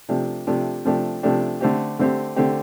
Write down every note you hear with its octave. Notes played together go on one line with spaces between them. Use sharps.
C3 F3 A3 D4 G4
C3 F3 A3 D4 G4
C3 F3 A3 D4 G4
C3 F3 A3 D4 G4
D3 A3 C4 G4
D3 A3 C4 G4
D3 A3 C4 G4